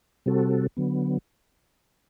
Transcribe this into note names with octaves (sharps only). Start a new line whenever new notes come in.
C3 G3 C4 F#4 A4
D3 F#3 B3